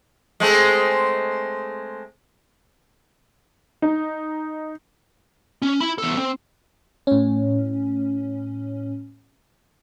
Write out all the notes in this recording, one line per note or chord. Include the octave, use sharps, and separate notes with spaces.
G#3 A3 C4
D#4
C#4
E4 B5
E2 A4
C4
A2 C#4